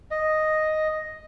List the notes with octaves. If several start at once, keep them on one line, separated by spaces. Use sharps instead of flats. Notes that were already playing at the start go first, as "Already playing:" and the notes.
D#5